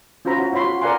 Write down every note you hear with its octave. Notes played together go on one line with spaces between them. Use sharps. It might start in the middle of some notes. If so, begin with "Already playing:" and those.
C#4 F4 F#4 C5 A#5 B5
E4 F#4 C#5
E4 F4 C#5 B5 C6
F#4
A#4 D5 F5 F#5 G#5 C6